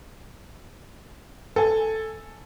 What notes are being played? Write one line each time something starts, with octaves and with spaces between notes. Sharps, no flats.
A4 G#5